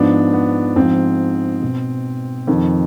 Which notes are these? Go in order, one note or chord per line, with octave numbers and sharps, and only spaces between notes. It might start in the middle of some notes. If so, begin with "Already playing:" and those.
Already playing: G#2 F3 B3 D4
B3
G#2 F3 C4
B2
F2 D#3